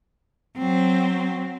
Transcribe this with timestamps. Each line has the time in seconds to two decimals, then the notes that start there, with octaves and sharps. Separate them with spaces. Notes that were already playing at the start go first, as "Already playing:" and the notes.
0.58 F#3 C4